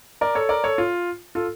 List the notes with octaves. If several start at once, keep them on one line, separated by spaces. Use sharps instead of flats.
A#4 D5
A4 C#5
A#4 D5
A4 C#5
F4
F4 A4